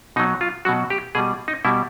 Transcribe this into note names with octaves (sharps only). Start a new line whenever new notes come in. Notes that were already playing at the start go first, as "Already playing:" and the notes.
B2 F#3 D#4
F4
B2 F#3 F#4
G4
B2 G3 G#4
D#4
B2 G3 E4